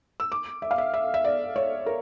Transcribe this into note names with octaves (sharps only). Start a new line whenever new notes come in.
E6
D6
E5
F5
E5
E5
E5
D5
C#5
A#4